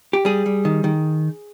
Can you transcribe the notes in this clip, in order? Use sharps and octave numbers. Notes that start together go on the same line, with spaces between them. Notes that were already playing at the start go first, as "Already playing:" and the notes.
G4
G3 G#4
G3
D#3
D#3